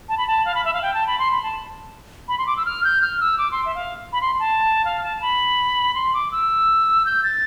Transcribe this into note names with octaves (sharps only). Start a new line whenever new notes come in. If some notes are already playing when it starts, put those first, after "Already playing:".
A5
B5
A5
F5
B5
E5
F5
G5
A5
B5
C6
B5
A5
B5
C6
D6
E6
F6
G6
F6
E6
D6
C6
E5
F5
B5
C6
A5
F5
A5
B5
C6
D6
E6
G6
A6